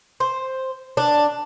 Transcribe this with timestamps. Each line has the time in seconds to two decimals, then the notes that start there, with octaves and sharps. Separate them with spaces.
0.20 C5
0.97 D4